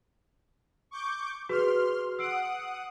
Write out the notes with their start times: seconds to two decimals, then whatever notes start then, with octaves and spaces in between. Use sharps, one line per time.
0.91 C#6 D6 G6
1.49 F#4 G#4 B4 C6 F6
2.19 F#5 D#6 E6 C7 D7